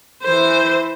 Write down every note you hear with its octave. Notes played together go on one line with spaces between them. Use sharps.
E3 C5